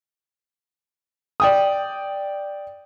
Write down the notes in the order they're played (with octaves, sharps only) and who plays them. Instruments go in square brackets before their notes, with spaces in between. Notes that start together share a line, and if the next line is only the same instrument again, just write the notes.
[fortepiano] D5 G5 D#6